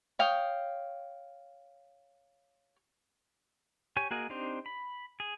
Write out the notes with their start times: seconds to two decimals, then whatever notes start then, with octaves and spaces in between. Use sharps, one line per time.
0.19 C#5 F5 G5 D#6
3.97 G4 C#5 G#5
4.11 A#3 F#4 G#4 A#4 D#5
4.30 C4 D4 D#4 G4 C5
4.66 B5
5.20 G#4